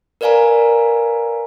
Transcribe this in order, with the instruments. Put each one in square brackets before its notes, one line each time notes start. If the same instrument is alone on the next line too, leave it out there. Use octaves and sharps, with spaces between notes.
[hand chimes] A#4 B4 D5 F5 G#5 A#5